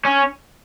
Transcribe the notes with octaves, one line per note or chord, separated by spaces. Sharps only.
C#4